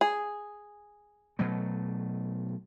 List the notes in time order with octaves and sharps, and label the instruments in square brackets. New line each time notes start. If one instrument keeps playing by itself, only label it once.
[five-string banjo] G#4
[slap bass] B2 F#3 A3